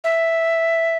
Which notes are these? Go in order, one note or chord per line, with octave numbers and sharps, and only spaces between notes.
E5